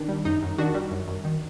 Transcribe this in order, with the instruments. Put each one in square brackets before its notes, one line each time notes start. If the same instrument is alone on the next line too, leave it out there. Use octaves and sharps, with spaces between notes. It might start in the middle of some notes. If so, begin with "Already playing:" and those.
Already playing: [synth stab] D#3 D4
G3
F#2 D#4
F#2
D#3 D4 F#4
G3
F#2
F#2
D#3